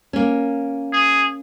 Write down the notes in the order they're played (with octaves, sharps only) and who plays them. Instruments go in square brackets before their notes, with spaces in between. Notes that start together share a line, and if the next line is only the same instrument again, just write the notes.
[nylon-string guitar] A#3 C#4
[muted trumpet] G#4